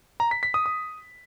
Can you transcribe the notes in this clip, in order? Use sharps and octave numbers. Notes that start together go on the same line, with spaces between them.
A#5
B6
B6
D#6
D#6